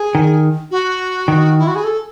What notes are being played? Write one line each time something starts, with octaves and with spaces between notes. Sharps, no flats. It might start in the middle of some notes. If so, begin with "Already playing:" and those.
Already playing: G#4
D#3
F#4
D#3
E4
F#4
G#4
A4